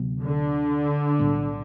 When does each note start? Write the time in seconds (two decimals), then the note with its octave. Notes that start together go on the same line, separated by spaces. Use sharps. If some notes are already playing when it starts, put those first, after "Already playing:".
Already playing: D2 C3 F#3 B3
0.22 D3
1.19 B1 A2 G3 B3